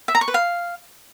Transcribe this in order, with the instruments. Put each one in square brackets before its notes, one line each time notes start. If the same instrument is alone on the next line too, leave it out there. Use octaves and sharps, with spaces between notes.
[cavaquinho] E5
A#5
C#6
B4
F5